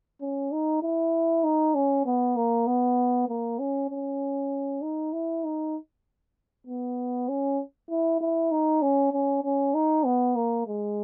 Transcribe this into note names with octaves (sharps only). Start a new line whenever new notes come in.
C#4
D#4
E4
D#4
C#4
B3
A#3
B3
A#3
C#4
C#4
D#4
E4
D#4
B3
C#4
E4
E4
D#4
C#4
C#4
C#4
D#4
B3
A#3
G#3